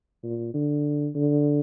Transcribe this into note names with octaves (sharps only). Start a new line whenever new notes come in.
A#2
D3
D3